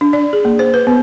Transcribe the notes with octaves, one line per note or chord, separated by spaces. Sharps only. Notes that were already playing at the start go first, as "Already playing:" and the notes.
D4
D5
G#4
A#3
C5
B4
B3